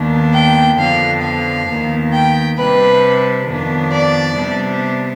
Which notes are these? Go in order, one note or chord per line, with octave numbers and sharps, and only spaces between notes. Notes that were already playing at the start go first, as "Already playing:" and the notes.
Already playing: D#2 D#3 B3 D4
G5
F2 D3 F3 B3 D4 F5
F5
D#2 D#3 B3
G5
C3 G3 D4 B4
F2 D#3 B3 D4
D5
C3 G3 B3 D4